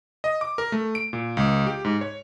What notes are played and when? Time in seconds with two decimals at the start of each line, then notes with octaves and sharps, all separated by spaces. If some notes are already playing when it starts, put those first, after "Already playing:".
0.24 D#5
0.41 D6
0.58 A#4
0.72 A3
0.95 D7
1.13 A#2
1.37 C#2
1.67 G4
1.85 G#2
2.01 C#5